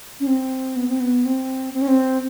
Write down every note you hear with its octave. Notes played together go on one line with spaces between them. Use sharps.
C#4
C4
B3
C4
B3
C4
C4
C#4
C4